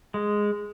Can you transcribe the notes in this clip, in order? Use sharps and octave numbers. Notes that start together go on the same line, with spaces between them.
G#3